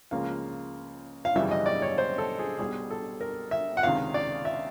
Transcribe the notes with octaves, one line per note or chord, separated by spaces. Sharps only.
C#2 C#3 F3 A#3 F5
F5
G#1 F#2 C#3 E3 G3 E5
D#5
D5
C#5
C5
A4
G#4
B1 B2 G3 G#4
A4
A#4
E5
F#5
C#2 C3 D#3 F5
D5
E5